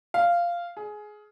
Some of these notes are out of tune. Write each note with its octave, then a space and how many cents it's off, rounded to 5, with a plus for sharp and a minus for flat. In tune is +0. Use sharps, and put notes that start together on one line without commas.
F5 -10
G#4 +15